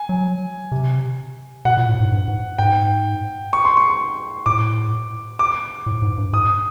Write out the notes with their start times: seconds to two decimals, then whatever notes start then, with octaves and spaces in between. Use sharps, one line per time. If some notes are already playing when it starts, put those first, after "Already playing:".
Already playing: G#5
0.09 F#3
0.72 C3
1.65 B2 F#5
1.77 A#2
1.89 A2
2.00 G#2
2.12 G2
2.28 G#2
2.58 G#2 G5
3.53 C#6
3.65 C6
3.77 C#6
4.46 A2 D6
5.39 D6
5.86 A2
6.02 G#2
6.18 G2
6.33 G#2 D#6